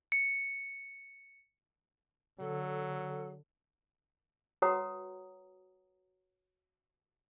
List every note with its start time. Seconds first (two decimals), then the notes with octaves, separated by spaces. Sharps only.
0.12 C#7
2.40 D3 F#3 A4
4.62 F#4 B4 C#5 F#5 A#5 D#6